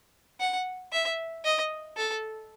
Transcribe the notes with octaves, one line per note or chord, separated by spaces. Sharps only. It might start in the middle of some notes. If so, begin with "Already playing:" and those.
F#5
E5
D#5
A4